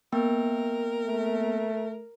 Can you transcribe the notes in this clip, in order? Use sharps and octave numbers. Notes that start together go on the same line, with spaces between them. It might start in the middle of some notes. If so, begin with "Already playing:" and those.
A#3 B3 A#4 G5
A3